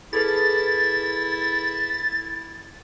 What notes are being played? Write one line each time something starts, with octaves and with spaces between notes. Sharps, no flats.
E4 G#4 A4 B4 A6